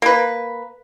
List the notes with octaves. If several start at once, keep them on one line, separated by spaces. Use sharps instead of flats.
A#3 B4